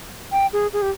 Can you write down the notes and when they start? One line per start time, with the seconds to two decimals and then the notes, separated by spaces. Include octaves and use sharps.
0.32 G5
0.53 G#4
0.73 G#4
0.82 G4